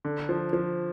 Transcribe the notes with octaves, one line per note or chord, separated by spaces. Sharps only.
D3
F3
F3